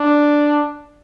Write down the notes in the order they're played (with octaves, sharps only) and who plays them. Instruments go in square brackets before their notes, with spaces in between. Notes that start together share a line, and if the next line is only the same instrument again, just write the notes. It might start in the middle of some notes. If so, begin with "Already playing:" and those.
Already playing: [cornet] D4